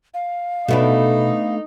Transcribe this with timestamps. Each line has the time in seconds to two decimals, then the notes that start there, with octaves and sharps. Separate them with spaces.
0.14 F5
0.68 B2 A3 B3 D4 D#4